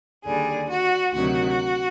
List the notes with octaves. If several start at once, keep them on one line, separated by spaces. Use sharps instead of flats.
D#2 D3 G3 G#4
F#4
D2 C3 D#3 F#3 F#4